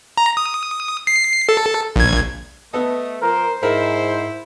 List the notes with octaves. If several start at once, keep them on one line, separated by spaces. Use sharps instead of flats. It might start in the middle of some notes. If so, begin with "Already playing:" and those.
A#5
D#6
C7
A4
A#1 G#6
A3 B3 A4 D#5
F3 A#4 C5
G#2 E4 A#4